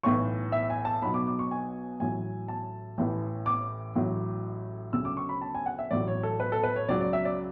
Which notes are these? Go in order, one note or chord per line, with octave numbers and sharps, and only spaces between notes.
B1 A2 E3 C#6
E5
G#5
A5
B1 B2 F#3 B5
D6
D6
C#6
G#5
A1 A2 F#3 G#5
A5
A1 A2 E3
D6
A1 A2 F#3
D2 C#3 F#3 E6
D6
C#6
B5
A5
G#5
F#5
E5
A1 A2 F#3 D5
C#5
A4
B4
A4
B4
C#5
C#2 C#3 F#3 D5
D5
E5
D5